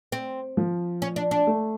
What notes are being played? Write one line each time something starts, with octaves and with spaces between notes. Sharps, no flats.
C4
F3
C#4
D4
D4
A3